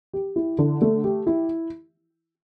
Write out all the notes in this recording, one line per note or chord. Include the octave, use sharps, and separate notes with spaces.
G4
E4
D3
A3
G4
E4